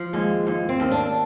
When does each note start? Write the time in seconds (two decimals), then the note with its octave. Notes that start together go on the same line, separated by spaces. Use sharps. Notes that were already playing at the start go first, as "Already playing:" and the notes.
Already playing: F3
0.13 D#2 G#3
0.47 D#2
0.69 C4
0.80 D#2
0.91 D4